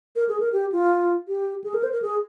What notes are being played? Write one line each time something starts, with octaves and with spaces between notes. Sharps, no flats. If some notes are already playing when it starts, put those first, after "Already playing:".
A#4
G#4
A#4
G4
F4
G4
G#4
A#4
C5
A#4
G#4